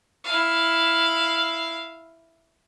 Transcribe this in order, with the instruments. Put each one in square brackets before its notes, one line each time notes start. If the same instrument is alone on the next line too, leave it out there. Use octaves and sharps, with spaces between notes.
[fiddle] E4 F5